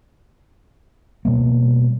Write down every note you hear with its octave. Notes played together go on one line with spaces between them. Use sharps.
B2 G3 A#3